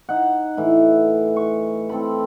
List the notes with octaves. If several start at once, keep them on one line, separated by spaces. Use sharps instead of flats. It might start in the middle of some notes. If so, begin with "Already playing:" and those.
D#4 F#5
A2 E3
C#6
C4 A4 B5